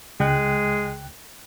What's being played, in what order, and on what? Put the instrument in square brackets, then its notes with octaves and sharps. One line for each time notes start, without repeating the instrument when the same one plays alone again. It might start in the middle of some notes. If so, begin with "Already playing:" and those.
[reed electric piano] C#2 G5 F#6 [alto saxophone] G#3